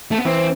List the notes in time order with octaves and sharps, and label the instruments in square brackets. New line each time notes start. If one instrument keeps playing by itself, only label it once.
[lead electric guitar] A3
B3
[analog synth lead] E3 [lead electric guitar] C4